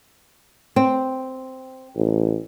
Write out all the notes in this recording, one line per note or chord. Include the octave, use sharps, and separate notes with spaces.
C4
A1